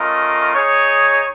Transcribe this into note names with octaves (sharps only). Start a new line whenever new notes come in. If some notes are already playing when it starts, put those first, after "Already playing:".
Already playing: A3 C#4 F4 A#4 D#5
D#4 G#4 C#5